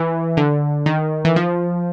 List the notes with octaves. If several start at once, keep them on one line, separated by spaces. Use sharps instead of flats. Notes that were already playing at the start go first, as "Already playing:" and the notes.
Already playing: E3
D3
D#3
E3
F3